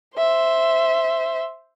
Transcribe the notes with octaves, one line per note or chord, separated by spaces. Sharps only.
C5 E5